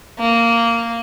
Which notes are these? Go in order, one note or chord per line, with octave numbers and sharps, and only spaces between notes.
A#3